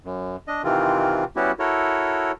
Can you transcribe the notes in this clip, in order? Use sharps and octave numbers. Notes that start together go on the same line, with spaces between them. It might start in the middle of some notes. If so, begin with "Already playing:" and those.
F#2
D4 D#5
C3 D#3 E3 C4 F4
G3 B3 C#4 E4 F#4 G4
E4 F#4 A4 A#4 C#5